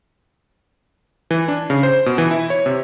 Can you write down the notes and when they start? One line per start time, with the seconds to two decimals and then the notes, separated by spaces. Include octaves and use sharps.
1.31 E3
1.48 D4
1.70 C#3
1.83 C5
2.06 B2
2.18 E3
2.31 E4
2.50 C#5
2.66 C3